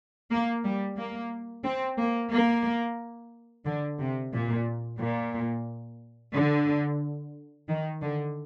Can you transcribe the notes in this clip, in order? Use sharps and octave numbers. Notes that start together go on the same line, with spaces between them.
A#3
G3
A#3
C4
A#3
A#3
D3
C3
A#2
A#2
D3
D#3
D3